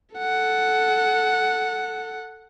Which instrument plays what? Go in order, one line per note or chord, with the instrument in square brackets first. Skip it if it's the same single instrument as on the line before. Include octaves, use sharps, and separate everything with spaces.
[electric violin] A4 F#5